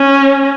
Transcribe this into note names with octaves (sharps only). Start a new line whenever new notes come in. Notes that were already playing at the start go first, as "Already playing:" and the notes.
Already playing: C#4